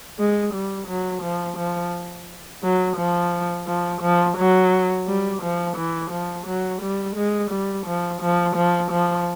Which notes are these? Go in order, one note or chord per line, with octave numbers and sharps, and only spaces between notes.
G#3
G3
F#3
F3
F3
F#3
F3
F3
F3
F#3
G3
F3
E3
F3
F#3
G3
G#3
G3
F3
F3
F3
F3